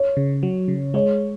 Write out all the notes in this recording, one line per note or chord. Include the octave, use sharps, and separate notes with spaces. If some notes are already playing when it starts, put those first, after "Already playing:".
Already playing: C#5
C#3
F#3
C#3
G#3 C#5